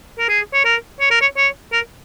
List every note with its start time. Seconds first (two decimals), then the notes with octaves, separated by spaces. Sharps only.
0.19 A#4
0.29 G#4
0.54 C#5
0.65 A#4
1.00 C#5
1.11 A#4
1.21 C#5
1.37 C#5
1.73 A#4